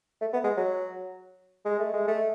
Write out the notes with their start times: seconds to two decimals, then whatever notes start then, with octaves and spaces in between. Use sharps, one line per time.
0.21 A3
0.33 B3
0.44 G#3
0.57 F#3
1.65 G#3
1.79 A3
1.94 G#3
2.07 A3